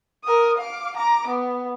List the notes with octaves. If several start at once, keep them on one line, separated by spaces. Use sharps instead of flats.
A#4 D#6
F5 D6
A#5 D6
B3